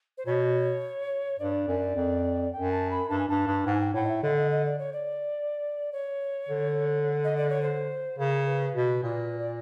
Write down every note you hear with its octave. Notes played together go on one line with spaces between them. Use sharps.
C5
B2 C#5
G2 D5
F#2
F2
F#2 G5
A5
B5
G2 A5
G#5
G2 A5
G2
G#2 G5
G#5
G5
A2 F#5
D#5
E5
D3 D#5
D#5
D#5
D5
C#5
D5
C#5
D3
D#5
D5
C#5
C5
C#3 A#4
B4
B2
A#2
D5